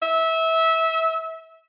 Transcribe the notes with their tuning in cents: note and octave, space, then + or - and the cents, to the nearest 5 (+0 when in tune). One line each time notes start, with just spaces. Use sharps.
E5 -20